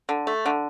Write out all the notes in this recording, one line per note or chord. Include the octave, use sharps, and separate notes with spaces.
D3
A3
D3